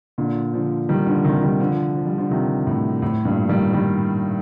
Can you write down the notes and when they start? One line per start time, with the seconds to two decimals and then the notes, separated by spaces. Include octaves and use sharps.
0.18 A#2 D3
0.54 D3 F3
0.89 D#3 G3
1.06 D3 F3
1.24 C3 D#3
1.42 D#3 G3
1.60 D3 F3
1.96 F3
2.06 G3
2.18 D3 F3
2.31 C3 D#3
2.67 A2
3.02 A2
3.25 G2 A#2
3.49 D#3 G3
3.73 D#3 G3